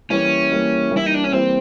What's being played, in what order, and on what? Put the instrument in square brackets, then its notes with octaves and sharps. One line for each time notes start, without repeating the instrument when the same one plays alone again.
[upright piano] E3 G3 A#3 [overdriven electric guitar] C#4
[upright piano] E3 G3 A#3
E3 G3 A#3
[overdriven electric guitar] E4
D#4
D4
C#4
[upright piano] E3 G3 A#3 [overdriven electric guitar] C4